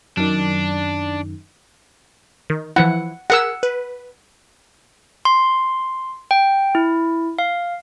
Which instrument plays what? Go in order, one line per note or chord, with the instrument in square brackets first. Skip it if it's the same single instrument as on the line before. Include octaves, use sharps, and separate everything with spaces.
[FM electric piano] F#2 D#3 [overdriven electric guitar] D4
[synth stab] D#3
[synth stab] E3 F3 E4 [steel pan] F#5
[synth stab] G#4 A#4 [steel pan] F#5 E6
[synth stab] B4
[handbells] C6
G5
E4
F5